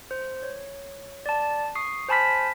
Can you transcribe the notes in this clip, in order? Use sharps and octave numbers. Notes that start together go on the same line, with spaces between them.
C5
C#5
D5 A5
C#6 D#6 C7
C5 G#5 A5 B5 F6 B6